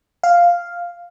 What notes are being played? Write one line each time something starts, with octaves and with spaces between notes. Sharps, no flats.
F5